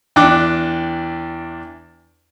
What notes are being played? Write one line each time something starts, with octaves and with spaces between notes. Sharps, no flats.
E2 D4 G5 D6 F#6